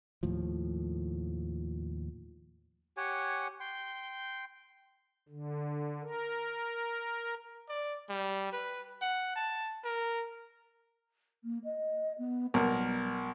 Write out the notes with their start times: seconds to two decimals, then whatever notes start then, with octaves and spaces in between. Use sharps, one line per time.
0.23 D#2 A2 F3
2.97 G4 C#5 F#5 G#5
3.60 G5 C6
5.29 D3
6.02 A#4
7.69 D5
8.09 G3
8.53 B4
9.02 F#5
9.36 A5
9.84 A#4
11.44 A#3
11.64 D#5
12.18 B3
12.54 B1 G3 A#4